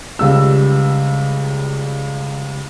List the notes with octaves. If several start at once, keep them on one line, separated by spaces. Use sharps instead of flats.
C#2 G3 E6